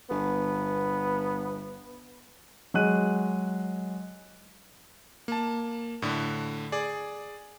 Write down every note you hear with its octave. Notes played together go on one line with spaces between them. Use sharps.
G1 B3
F#3 G#3 F#6 D#7
A#3 A5
A2 D3
G#4 D5